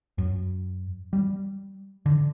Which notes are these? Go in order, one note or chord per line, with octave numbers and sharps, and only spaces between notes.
F#2
G3
D3